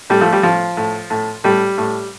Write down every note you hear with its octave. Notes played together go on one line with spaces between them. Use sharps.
A2 G3
F3 A3
G3
A2 F3
A2
A2
A2 G3
A2